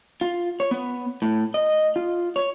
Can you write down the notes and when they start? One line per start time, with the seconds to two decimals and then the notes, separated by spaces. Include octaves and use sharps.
0.21 F4
0.60 C#5
0.71 B3
1.22 A2
1.54 D#5
1.96 F4
2.36 C#5